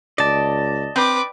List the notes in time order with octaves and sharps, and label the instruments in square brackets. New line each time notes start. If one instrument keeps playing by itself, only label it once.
[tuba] C#2 [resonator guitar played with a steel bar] D5 [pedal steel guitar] D#5 A5
[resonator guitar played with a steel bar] C4 [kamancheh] B4 D6